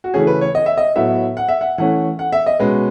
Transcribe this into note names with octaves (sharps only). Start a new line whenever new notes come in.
F#4
C#3 E3 A3 C#4 G#4
B4
C#5
D#5
E5
D#5
A2 F#3 B3 E5
F#5
E5
F#5
E3 A3 C#4 F#5
F#5
E5
D#5
B2 G#3 C#4 B4